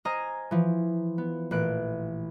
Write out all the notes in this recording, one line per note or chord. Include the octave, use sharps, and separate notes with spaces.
C5 D#5 G#5 A#5 D#6 F6
E3 F3
B3
A1 A#2 E3 F#6 D7